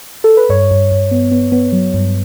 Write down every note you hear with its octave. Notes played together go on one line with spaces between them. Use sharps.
A4
B4
G2 C#5
G2
G2
B3
B3
B3
F#3
G2